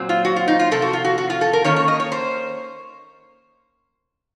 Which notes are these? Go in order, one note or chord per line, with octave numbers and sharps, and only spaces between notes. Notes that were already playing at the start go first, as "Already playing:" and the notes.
Already playing: A#2 F#3 C4
F4
F#4
F4
D#4
F4
F2 C3 A4
F#4
F4
F#4
F#4
F4
A4
A#4
D#3 A#3 C#4 C#5
C#5
D#5
C#5
C5